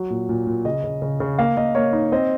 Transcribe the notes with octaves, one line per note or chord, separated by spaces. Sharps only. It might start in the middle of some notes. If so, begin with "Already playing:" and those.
Already playing: F#3
A#2
A#2
A#2
C#3 D#5
C#3
C#3
C#3
A#3 F5
A#3 D#5
A#3 C#5
D#4
C4 D#5